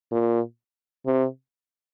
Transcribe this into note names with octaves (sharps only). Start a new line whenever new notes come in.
A#2
C3